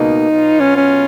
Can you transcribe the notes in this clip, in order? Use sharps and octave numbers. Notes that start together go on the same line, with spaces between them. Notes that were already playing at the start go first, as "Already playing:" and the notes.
Already playing: C#2 B2 A#3 D#4
B2 F#3 B3 F4
C#4
C#4